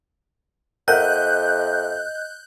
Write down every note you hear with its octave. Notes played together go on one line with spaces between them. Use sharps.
F2 A#4 D#5 E5 F#5 F#6 G6